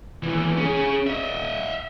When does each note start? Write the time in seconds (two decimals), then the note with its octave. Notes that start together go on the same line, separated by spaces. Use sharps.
0.23 D#2 E3
0.57 C#4 G#4
1.07 D#5 E5